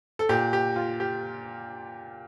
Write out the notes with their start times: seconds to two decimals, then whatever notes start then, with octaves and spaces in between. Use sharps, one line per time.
0.19 A4
0.29 A#2 G4
0.53 G4
0.76 F4
1.00 G4